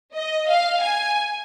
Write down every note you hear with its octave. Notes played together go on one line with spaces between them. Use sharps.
D#5
F5
G#5